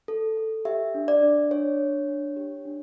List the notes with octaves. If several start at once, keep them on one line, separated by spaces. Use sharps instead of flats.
A4
A4
G4 E5
D4
D5
D4
D4 C#5
D4
D4
G4
D4